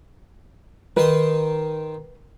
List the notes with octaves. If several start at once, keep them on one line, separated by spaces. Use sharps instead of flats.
D#3 D#4 B4 C6